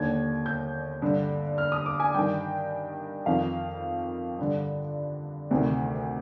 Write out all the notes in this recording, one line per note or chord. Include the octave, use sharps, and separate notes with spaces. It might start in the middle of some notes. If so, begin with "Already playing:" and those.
Already playing: D#2 D3 G#6
G6
G2 D3
F6
D#6
D6
G#5
G2 D#3 G5
F2 D#3 F5
G2 D3
D2 C3 D#3